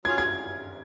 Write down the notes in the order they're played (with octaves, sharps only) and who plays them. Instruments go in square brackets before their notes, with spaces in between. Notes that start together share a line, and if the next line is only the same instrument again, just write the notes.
[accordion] F#3 C#4 F4 G#4 [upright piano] G#6
[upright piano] G#6